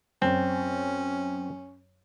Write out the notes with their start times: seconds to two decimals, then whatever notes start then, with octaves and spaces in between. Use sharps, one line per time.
0.22 F#2 C4 C#4